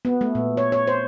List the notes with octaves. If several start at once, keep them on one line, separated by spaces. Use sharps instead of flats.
B3
A3
A#2
C#5
C#5
C5